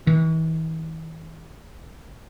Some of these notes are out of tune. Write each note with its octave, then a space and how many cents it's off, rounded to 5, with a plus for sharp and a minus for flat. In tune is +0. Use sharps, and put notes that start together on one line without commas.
E3 -40